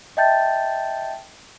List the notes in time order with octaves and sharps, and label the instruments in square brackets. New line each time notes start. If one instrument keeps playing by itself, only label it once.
[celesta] D#5 E5 G5 A5 G6 A6